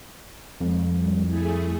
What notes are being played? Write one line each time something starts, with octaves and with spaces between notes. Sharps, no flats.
F2 G#3
G3
A3 E4 G#4